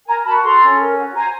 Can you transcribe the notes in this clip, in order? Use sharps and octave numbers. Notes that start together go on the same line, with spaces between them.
A#4 G#5 A#5
F#4 A5 B5
A4 A#5 C6
C#4
A#4
F#4
C5 G#5 A#5